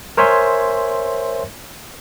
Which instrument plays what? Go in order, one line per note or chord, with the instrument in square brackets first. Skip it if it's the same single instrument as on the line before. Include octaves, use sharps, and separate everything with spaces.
[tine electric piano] A#4 C5 C#5 E5 G#5 C6